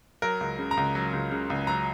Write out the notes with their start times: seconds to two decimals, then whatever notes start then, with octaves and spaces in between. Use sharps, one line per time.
0.22 F#3 A#4
0.41 C#2
0.59 C#3
0.71 A#5
0.77 C#2
0.95 F#3
1.13 C#2
1.31 C#3
1.50 C#2
1.67 F#3 A#5